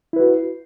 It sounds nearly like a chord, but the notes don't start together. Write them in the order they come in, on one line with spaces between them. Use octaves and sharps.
E4 B4 F#4